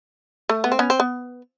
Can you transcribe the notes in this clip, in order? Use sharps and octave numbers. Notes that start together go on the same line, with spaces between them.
A3
B3
C4
B3 C#4
C4
B3